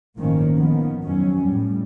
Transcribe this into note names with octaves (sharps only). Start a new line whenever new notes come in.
G1 A2 D#3 F3 A#3 C#4
D#3 F3 B3
F2 F#3 C#4
A2 G3